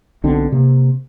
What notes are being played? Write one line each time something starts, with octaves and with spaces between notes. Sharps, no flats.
B1 B2 D3 C4
C3 A#3